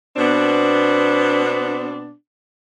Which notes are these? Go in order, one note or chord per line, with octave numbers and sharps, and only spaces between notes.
B2 B3 C4 D4